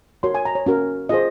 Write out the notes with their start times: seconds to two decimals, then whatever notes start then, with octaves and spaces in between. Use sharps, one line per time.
0.23 F#4 A#4 C#5 C6
0.35 G#5
0.45 A#5
0.55 C#5
0.66 C#4 F#4 A#4
1.09 F4 G#4 C5 D#5